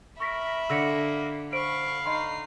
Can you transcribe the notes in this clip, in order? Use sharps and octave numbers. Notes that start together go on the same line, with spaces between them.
A#4 E5 B5 C#6 A#6 B6
D3 A#3 E6 A#6 C#7
C5 F5 B5 C#6 D7
D#4 D#5 B5 C6 C7